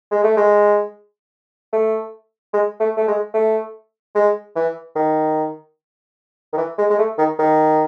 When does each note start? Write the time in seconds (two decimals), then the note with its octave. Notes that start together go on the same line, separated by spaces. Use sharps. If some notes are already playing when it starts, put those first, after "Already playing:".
0.11 G#3
0.24 A3
0.37 G#3
1.73 A3
2.54 G#3
2.80 A3
2.97 A3
3.08 G#3
3.34 A3
4.15 G#3
4.56 E3
4.96 D#3
6.53 D#3
6.57 E3
6.78 G#3
6.90 G#3
6.98 A3
7.18 D#3
7.39 D#3